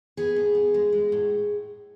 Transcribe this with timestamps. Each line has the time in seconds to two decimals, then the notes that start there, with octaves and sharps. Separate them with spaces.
0.17 B3 G#4
0.36 A2
0.55 B3
0.74 G#3
0.93 G#3
1.12 A2